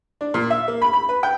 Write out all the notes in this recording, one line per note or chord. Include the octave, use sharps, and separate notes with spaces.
D4
A#2
E5
A#3
B5
B5
B4
G5